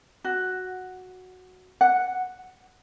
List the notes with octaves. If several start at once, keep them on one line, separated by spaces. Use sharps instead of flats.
F#4
F#5